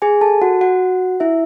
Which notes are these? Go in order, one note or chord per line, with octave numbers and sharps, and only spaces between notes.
G#4 G#5
A4 A5
F#4 F#5
F#4 F#5
E4 E5